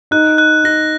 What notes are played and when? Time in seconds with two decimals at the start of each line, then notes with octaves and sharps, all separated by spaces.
0.11 D#4 F#6
0.38 F#6
0.64 D#4 A#6